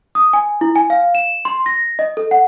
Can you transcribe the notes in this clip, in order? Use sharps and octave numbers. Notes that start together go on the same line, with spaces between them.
D#6
G#5
E4
G#5
F5
E7
C6
A#6
D#5
A4
F#5